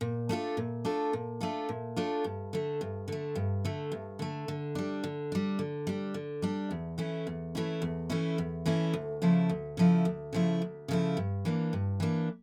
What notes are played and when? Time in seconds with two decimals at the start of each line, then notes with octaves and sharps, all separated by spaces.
0.01 A#2
0.29 A3 D4 F4 A4
0.57 A#2
0.85 A3 D4 F4 A4
1.13 A#2
1.41 A3 D4 F4 A4
1.69 A#2
1.96 A3 D4 F4 A4
2.24 G2
2.53 D3 A3
2.81 G2
3.08 D3 A3
3.35 G2
3.65 D3 A3
3.92 G2
4.19 D3 A3
4.48 D3
4.75 G3 D4
5.04 D3
5.32 G3 D4
5.59 D3
5.87 G3 D4
6.14 D3
6.42 G3 D4
6.71 E2
6.98 E3 A3 C#4 E4
7.27 E2
7.55 E3 A3 C#4 E4
7.82 E2
8.10 E3 A3 C#4 E4
8.38 E2
8.66 E3 A3 C#4 E4
8.93 D2
9.22 C#3 F3 A3 E4
9.49 D2
9.77 C#3 F3 A3 E4
10.05 D2
10.33 C#3 F3 A3 E4
10.62 D2
10.88 C#3 F3 A3 E4
11.17 G2
11.45 E3 A#3 D4
11.73 G2
12.00 E3 A#3 D4